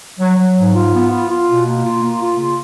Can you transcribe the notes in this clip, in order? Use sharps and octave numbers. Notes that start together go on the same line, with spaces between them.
F#3
F#3
G#2
F4
B3
F4
F4
B2
A#3
F4
A#3
F4
C#3